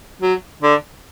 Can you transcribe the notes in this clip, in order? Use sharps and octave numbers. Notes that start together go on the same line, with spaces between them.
F#3
D3